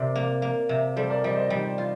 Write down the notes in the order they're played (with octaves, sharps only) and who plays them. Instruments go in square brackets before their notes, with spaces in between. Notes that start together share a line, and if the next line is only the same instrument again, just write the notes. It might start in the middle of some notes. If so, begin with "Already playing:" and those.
Already playing: [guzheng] C3 [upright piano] A#4 D5
[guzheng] A#3
A#3
C3
[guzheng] G3 [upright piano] A4 C5
[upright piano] A#4 D5
[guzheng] G3 [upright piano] C5 D#5
[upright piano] D5
C5 D#5
[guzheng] G3 [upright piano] D#4 G4
[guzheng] F4